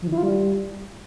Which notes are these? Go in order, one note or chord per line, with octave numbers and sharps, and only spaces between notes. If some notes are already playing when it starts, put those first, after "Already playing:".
F3
D#3
E4
F4
G3